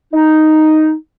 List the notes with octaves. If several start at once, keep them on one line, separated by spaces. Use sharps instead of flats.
D#4